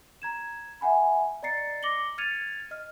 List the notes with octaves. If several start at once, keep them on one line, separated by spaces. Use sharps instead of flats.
A#5 G#6 E7
E5 F#5 G#5 B5
D5 D#5 A#5 A6 C7 C#7
D6 A#6 C#7 F#7 G7
F6 G#6 A6 C#7 D#7 F7
D#5 F6